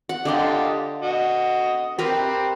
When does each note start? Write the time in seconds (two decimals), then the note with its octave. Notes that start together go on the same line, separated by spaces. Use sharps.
0.09 F#5
0.25 D3 F4 G4 D5 D#5 C6
1.02 F#4 D#5
1.99 C4 G4 A#4 B4